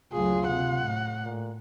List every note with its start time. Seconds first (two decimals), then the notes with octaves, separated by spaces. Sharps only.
0.13 F#1 D2 F#3 F4 G#4
0.47 C3 F#5
0.87 A2
1.24 A#2